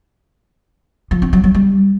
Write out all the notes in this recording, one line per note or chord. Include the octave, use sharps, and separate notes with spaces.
F3
C4
F#3
F#3
G3